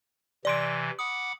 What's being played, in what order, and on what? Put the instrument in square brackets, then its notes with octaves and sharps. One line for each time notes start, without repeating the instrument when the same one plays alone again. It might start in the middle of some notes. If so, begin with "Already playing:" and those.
[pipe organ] C3 E3 [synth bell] D5 C6 D7
[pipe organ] F#5 B5 D6 [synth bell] D#6